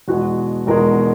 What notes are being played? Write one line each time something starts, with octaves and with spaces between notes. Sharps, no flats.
E2 B2 G#3 F#4
E2 B2 G#3 A#4